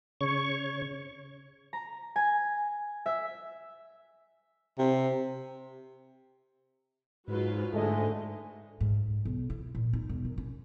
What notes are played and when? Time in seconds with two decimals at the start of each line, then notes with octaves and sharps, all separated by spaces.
0.21 C#3 C#5 C#6
1.73 A#5
2.16 G#5
3.06 E5
4.79 C3
7.28 G#2 F#3 F4 B4
7.73 G#2 D3 G#3 A3 A4 D#5
8.81 G#2
9.25 B1
9.50 E4
9.75 A#2
9.93 D#4
10.09 E1
10.25 D#3
10.38 C#4